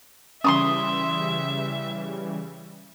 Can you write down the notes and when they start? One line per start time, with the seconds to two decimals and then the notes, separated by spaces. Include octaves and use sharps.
0.44 C#3 E3 G3 C#4 E5 C6 C#6 D#6